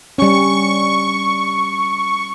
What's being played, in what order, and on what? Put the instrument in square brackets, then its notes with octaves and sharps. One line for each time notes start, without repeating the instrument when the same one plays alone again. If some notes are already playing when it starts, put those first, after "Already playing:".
[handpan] G3 C#4 [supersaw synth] C#6